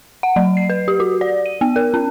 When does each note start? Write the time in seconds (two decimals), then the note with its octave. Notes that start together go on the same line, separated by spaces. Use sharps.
0.23 F#5
0.36 F#3
0.57 C7
0.70 B4
0.88 G4
1.00 F#4
1.21 D5
1.46 D#7
1.61 B3
1.76 A#4
1.94 C#4